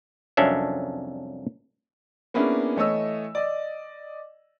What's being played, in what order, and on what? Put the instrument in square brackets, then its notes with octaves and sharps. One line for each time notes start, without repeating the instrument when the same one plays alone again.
[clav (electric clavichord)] C2 F2 F#3 C#4 D4 E5
[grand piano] A#3 B3 C#4 D4 E4 G#4
E3 A3 C#5 D#5 E6
D5 D#5